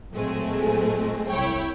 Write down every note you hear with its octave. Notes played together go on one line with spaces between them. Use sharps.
A#2 F#3 G#3 A3 C4
C2 E4 C#5 G5